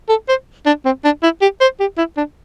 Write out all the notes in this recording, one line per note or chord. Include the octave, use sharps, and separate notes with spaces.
A4
C5
D4
C4
D4
E4
G4
C5
G4
E4
D4